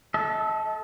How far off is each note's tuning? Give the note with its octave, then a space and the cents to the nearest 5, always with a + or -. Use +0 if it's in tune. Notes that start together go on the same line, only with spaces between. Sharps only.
A4 -15 D#5 +40